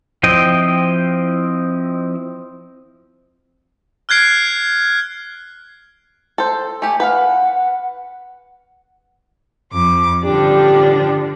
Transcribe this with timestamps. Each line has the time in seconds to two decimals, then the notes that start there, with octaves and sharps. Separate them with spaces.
0.23 F3 C4 E4 D#5 G5
4.09 F6 F#6 G#6 C7 D7
6.38 A4 C5
6.82 A3 G4 G#5
7.00 B4 F5 F#5
9.73 F2 D6
10.24 A1 G2 D3 F3 D4 G4